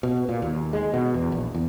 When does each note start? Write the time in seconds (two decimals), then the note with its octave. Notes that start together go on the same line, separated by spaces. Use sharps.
0.03 B2
0.29 A#2
0.42 D#2
0.73 G#3
0.94 B2
1.14 E2
1.32 A#1
1.55 E2